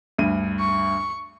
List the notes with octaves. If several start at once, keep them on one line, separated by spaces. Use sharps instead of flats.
D2 G2 D#7
C#6